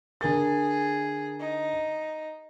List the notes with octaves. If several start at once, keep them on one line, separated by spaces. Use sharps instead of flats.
D3 G#4 A#4 A6
D#4